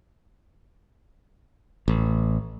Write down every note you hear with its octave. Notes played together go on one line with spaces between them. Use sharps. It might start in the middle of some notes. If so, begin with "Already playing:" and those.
A1